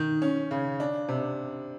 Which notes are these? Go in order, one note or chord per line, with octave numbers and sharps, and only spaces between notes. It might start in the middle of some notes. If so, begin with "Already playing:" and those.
Already playing: D#3
C#4
C#3
D4
C3